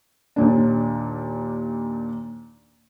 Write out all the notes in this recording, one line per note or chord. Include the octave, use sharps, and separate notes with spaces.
D#2 A#2 D4